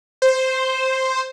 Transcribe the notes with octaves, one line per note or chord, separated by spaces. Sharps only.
C5